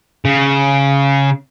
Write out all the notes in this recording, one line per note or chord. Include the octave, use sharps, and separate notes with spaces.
C#3